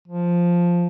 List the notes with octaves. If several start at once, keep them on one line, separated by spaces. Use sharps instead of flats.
F3